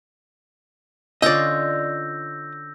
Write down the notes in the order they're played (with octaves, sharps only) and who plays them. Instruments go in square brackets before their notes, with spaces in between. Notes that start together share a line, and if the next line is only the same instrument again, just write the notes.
[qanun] D3 C#4 F4 [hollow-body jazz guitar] D5 D#5 [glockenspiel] E6 G6 A#6